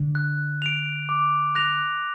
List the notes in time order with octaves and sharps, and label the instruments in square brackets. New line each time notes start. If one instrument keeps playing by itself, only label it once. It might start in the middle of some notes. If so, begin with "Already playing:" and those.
Already playing: [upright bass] D3
[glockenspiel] F#6
D7 F7
D6
F#6 A#6 F7